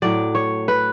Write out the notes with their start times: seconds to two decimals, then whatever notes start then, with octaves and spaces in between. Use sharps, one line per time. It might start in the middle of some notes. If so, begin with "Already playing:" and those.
0.02 A2 F#3 D5
0.35 C#5
0.68 B4